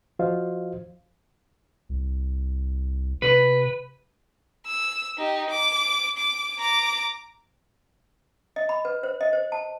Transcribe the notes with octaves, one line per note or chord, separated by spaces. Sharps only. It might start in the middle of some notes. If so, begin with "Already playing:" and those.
F3 F4 F#4 C5 D#5 F5
C2
C3 B4
E6
D#4 G4
D6
D6
A#5 D6
D#5
B5
B4
C5
D#5
C5
A5